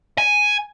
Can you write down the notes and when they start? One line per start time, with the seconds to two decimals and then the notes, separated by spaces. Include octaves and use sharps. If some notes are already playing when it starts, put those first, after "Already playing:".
0.18 G#5